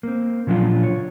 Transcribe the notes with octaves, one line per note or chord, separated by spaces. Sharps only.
A#3 C4
A#2 C#3 F3 F#3 D4 F4
C#5